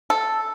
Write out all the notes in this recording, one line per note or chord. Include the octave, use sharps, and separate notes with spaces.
A4